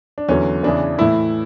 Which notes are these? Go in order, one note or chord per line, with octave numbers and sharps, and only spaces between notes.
D4
E2 D3 F#3 C#4
E2 C#3 E3 D4
A2 E3 E4